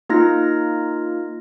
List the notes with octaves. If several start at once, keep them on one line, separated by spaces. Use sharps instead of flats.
A#3 D#4 F4 F6 A#6